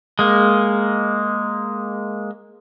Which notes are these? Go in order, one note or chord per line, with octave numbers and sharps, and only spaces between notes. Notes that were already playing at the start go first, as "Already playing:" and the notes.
G#3 A#3